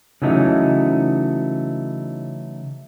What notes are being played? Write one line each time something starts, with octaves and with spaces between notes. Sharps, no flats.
C#3 E3 F#3 A3 D#4